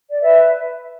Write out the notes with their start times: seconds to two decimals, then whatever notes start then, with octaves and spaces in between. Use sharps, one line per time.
0.09 D5
0.21 B4 E5